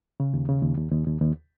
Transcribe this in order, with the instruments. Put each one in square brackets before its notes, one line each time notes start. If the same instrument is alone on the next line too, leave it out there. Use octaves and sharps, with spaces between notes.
[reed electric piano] C#3
D#2
C#3
D#2
D#2
D#2
D#2
D#2